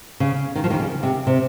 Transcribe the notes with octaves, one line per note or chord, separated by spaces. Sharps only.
C#3
D#3
F3
D#2 D#3
C#3
C3
C3